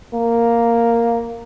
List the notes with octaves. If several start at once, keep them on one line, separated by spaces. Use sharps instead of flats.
A#3